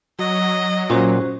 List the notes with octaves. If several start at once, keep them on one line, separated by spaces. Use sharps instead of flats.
F#3 D#5
A#2 C#4 F#4 C5